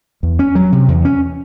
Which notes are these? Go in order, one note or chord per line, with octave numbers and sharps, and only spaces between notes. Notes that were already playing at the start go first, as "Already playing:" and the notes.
E2
C#4
F#3
C3
E2
C#4